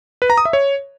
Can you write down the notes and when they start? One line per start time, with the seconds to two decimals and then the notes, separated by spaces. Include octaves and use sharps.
0.22 B4
0.30 A#5
0.38 D#6
0.45 E5
0.53 C#5